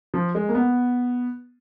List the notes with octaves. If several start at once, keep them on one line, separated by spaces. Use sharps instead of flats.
F3
G#3
A#3
B3